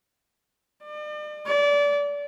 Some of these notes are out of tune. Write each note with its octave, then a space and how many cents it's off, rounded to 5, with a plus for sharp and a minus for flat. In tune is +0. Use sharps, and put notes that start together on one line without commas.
D5 +40
D5 -25